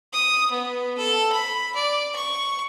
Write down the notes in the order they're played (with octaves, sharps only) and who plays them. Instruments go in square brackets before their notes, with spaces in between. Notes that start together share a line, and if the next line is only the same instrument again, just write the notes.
[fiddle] D#6
B3
A4
B5
D5
C#6